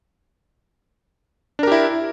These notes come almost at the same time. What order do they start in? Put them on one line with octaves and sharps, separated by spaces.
D4 A#4 G4 E4